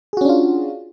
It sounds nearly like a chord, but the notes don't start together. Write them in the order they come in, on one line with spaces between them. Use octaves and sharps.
G#4 F#4 C#4 D4 F4